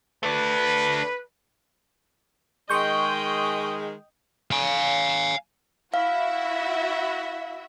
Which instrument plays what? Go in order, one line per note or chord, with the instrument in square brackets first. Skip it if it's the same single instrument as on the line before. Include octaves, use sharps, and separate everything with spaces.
[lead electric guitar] A3 D4 [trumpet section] B4
[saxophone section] D#3 G#3 [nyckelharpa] D#5 G5 [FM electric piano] C6 C#6 G6
[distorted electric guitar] F5 G#5
[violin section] E4 F#4 E5 [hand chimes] F5